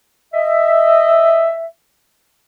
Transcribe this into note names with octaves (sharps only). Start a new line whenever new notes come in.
D#5 E5